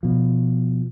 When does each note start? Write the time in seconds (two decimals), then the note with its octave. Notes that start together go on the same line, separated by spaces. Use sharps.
0.03 B2 F3